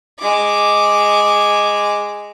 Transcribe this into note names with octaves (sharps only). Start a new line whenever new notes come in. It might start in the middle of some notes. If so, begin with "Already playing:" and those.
G#3 D6